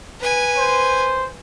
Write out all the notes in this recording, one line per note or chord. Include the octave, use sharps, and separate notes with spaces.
B4 G#5
C5